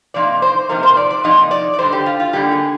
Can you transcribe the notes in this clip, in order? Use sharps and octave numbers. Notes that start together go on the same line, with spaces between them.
C3 F3 A#3 D#4 D5
C5
C3 F3 A#3 D#4 A#4
C5
D5
D5
C3 F3 A#3 D#4 D#5
D5
D5
D3 G3 A#3 D#4 C5
G4
F4
F4
D3 G3 A#3 D#4 G4
G#4